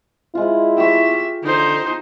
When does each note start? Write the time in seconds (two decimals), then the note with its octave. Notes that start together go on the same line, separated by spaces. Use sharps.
0.35 G#3 E4 F4
0.78 G4 E5 C#6
1.44 D3 D#4 C5